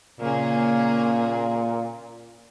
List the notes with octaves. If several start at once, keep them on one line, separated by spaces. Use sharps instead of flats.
A#2 C#3 A#3 C#4 G#4